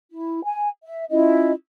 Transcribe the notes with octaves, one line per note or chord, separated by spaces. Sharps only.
E4
G#5
E5
C#4 E4 F4 D#5